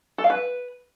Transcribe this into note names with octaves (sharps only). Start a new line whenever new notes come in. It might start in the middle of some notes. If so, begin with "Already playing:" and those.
A4
F5
B4